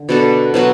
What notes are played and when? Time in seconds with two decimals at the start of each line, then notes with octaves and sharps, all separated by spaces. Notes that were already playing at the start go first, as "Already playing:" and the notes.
Already playing: D3
0.09 B2 B3 D4 A4
0.54 B2 F#3 B3 F#4